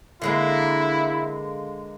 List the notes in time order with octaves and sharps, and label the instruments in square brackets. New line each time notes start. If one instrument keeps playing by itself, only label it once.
[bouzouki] D3 G#3 A#3 [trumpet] E4